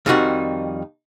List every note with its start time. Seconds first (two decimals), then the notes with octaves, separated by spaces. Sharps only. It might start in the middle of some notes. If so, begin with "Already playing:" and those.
0.06 F2 D#3 G3 C4 D#4 F#4